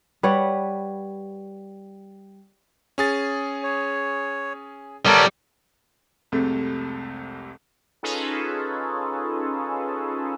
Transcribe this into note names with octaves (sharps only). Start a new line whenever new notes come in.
G3 B4 C#5 F#5
C#4 G#4 A6
C#5
G3 B3 A4 A#4 C#5
C2 F2 C3 G#3 A3
C#4 D#4 F4 G#4 A4 B4